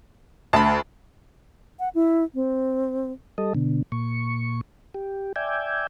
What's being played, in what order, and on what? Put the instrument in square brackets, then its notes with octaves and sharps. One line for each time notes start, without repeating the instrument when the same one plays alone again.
[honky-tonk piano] D2 [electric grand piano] A5 B5
[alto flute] F#5
E4
C4
[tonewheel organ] G3 A4 D#5
B2 D3
A#2 C#6
G4
D5 E5 G5 G#5